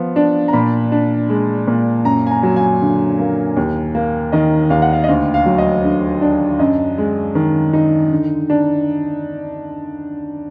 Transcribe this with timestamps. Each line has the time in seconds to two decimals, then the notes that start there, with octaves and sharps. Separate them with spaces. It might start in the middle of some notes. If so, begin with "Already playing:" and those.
Already playing: F3 B3
0.16 D4
0.48 A#5
0.53 A#2 B5
0.92 D4
1.29 G#3
1.67 A#2
2.05 F#2 A#5
2.27 G#5
2.31 A#5
2.43 F#3
2.56 G#5
2.82 D3
3.19 A#3
3.57 D#2
3.95 A#3
4.32 D#3 D#5
4.70 D#2 F5
4.82 F#5
4.93 F5
5.04 D#5
5.08 D2 F5
5.34 F5
5.46 F#3
5.58 D#5
5.84 D3
6.22 D4
6.59 F#2 D#5
6.98 G#3
7.35 D#3
7.73 D#4
8.11 D3
8.50 D4